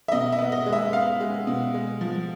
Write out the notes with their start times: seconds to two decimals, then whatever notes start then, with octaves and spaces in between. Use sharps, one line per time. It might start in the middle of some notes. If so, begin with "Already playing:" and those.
0.08 E5
0.12 B2 D#5
0.32 E5
0.39 B3
0.52 D#5
0.66 G#3
0.73 E5
0.93 B3 F5
1.20 G#3
1.47 B2
1.74 G#3
2.01 F3